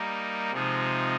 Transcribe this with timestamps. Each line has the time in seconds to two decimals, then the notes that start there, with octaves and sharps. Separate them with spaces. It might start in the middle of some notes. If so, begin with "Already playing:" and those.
Already playing: G3 A#3 D#4
0.52 C3 F3 G#3 D#4